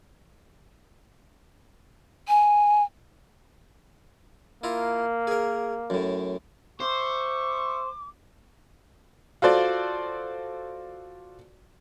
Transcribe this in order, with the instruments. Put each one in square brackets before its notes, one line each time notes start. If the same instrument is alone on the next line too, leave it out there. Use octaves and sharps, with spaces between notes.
[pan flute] G#5
[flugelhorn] A#3 [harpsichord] E4 F4 A#5
[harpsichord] G#4 A#4
F#2 A2
[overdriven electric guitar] C5 [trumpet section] E5 C#6 [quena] D6
[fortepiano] F4 F#4 A4 C5 D5